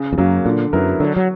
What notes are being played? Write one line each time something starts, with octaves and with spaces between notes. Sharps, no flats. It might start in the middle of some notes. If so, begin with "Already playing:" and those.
Already playing: C#3
E2
F#2 F#3 A#3
A#2 D3
F#2 F#3 B3 E4 A#4
D3 F#3
F#3